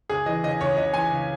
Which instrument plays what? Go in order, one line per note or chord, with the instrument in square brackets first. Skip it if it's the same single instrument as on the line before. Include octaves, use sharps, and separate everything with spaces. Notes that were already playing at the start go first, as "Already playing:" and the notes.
[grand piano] C#2 G#4
E3 D#5
C#3 D#5
C#2 C#5
C#2 D#5
E3 G#5
C#3